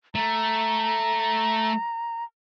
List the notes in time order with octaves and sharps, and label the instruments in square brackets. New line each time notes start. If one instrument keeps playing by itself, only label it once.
[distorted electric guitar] A3 [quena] A#5